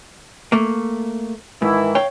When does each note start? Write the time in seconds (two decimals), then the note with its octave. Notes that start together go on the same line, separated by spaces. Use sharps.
0.52 A3 A#3
1.62 G#2 D#3 E3 E4
1.95 C#5 F5 G5